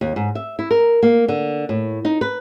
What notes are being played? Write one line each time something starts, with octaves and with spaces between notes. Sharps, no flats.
D#2
G#2
E5
E4
A#4
A#3
D3
A2
D#4
B4